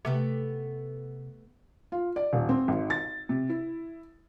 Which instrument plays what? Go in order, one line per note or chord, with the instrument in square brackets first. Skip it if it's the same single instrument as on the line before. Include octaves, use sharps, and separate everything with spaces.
[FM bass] C3 [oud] A3 B3 G4
[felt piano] F4
D5
D#1
C4
G#1
A6
C3
E4